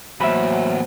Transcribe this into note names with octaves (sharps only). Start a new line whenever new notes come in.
E2 A2 F#3 A#3 B3 C5 E5 B5